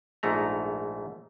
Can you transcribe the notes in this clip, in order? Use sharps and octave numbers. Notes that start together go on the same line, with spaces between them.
A#1 G#2 A3 A#5